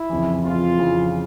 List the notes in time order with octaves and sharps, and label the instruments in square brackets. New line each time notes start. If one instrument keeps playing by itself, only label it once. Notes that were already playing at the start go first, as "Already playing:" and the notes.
Already playing: [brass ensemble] E4
[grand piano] F2 C#3 E3
[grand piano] F2 C#3 E3 [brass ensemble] F4
[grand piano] F2 C#3 E3